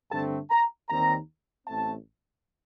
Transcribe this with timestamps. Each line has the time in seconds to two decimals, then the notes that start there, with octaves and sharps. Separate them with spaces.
0.11 G2 D3 A3 C4 A5
0.50 A#5
0.89 D#2 D#3 G3 C4 A#5
1.68 A1 A2 A3 C4 A5